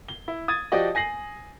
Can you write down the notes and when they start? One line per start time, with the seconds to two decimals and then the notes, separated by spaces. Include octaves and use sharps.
0.08 G7
0.28 E4
0.48 D#6 G#6 A6 D#7
0.72 F3 F#4 G4 D5 D#5
0.95 G#5 A#6 C7 F#7